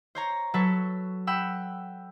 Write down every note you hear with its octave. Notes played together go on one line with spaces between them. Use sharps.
C5 C#5 A#5
F#3 A4 B4 C#5
F#5 G5 B5 E6